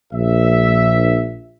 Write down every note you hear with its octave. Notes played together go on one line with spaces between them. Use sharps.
A#1 E5